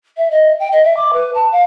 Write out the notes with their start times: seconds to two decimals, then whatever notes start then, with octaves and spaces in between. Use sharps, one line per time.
0.17 E5
0.31 D#5
0.59 G5
0.72 D#5
0.84 E5
0.97 D6
1.13 B4
1.35 A5
1.52 F5